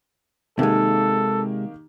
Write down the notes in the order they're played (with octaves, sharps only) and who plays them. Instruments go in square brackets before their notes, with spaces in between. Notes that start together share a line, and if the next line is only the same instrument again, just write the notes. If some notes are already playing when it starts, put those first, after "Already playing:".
[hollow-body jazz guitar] C3 G#3 [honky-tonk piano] D#3 A#3 G4 [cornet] A4